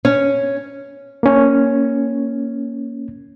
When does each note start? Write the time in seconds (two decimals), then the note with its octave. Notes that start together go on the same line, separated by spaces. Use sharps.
0.05 C#4
1.23 A#3 C#4